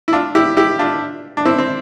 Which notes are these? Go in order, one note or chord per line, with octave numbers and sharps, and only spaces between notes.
E4
D4 F4
E4 G4
E4 G4
D4 F4
D4
C4 E4
C4